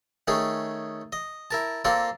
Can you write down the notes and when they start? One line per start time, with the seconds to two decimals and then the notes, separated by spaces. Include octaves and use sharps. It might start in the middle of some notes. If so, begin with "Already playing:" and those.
0.28 D#3 A3 C#4 G#4
1.13 D#5
1.51 E4 A#4 A5
1.85 A#3 C4 F4 A4 A#4 D5